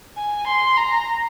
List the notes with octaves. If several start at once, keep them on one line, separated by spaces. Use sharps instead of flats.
G#5
C6
A#5